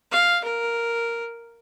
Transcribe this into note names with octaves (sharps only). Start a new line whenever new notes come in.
F5
A#4